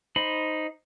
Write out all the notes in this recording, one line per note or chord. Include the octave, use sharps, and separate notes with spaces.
D#4 C5 B5